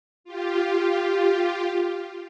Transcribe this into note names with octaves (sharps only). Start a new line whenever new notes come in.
F4 G4